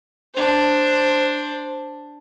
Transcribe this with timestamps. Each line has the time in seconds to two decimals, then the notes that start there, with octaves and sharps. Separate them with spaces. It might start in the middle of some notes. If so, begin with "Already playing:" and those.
0.34 D4 C5